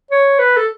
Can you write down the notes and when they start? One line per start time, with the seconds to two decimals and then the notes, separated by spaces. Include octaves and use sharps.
0.11 C#5
0.39 B4
0.57 A4